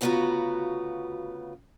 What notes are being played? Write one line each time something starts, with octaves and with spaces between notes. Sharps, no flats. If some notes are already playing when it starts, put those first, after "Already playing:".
D2 C#3 B3 F4 F#4 A#5